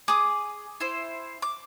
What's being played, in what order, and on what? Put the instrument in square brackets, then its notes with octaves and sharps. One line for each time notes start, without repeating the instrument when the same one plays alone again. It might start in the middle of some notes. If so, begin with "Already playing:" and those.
[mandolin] G#4 [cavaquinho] D6 D#6
[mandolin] E4 C5
D6